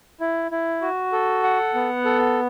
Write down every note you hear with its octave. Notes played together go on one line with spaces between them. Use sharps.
E4
E4
F#4
A4
F#5
B3
A4